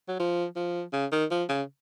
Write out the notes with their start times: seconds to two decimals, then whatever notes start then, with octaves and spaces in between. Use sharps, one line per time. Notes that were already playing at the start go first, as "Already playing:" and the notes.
0.08 F#3
0.19 F3
0.56 F3
0.93 C#3
1.12 D#3
1.30 F3
1.49 C#3